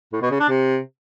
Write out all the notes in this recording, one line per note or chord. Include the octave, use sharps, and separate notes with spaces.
A2
B2
C#3
D4
C3